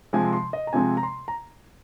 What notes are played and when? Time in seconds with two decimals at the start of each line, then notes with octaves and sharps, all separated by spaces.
0.13 C3 F3 G#3 C4 G#5
0.33 C6
0.53 D#5
0.67 A#5
0.73 C3 F3 G#3 C4 G#5
0.97 A#5
1.03 C6
1.28 A#5